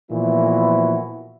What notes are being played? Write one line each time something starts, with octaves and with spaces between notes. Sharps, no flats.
A#2 E3 F3 B3 E4 F#4